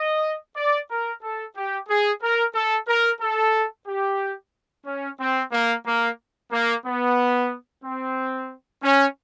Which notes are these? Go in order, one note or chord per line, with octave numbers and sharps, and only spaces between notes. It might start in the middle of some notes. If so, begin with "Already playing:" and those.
Already playing: D#5
D5
A#4
A4
G4
G#4
A#4
A4
A#4
A4
G4
C#4
C4
A#3
A#3
A#3
B3
C4
C#4